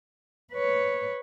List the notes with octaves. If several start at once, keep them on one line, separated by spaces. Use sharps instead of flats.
B4 C#5